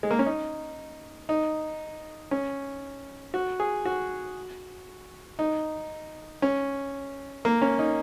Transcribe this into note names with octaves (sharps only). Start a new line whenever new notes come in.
G#3
A#3
C#4
D#4
D#4
C#4
F#4
G#4
F#4
D#4
C#4
A#3
C#4
D#4